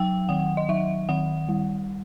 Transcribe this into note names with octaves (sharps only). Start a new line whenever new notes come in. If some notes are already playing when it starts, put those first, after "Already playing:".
Already playing: F#3 G5
D#3 F#5
D#5
F#3 E5
D#3 F#5
G3